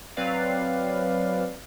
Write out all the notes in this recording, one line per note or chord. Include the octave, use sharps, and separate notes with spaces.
F#3 C4 B4 D5 F5